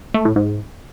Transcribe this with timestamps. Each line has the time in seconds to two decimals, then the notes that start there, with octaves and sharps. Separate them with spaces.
0.14 A3
0.25 A2
0.36 G#2